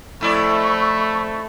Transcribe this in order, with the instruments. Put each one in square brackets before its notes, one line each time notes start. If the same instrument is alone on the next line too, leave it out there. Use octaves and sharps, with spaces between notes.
[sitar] F2 E4 D5 [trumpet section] A3 [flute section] B5 C#6